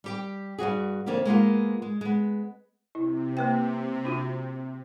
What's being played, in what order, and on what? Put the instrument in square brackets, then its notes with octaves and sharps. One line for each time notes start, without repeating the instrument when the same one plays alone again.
[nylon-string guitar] G3 G4 G5
G2 A#2 F#4 G#4
F2 D3 A#3 C#4 G4
G#3 A#3 B3 F4
G#3
G#3 B3
[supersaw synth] C3 [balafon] E4
[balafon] A#3 B4 G5
D4 F4 F#4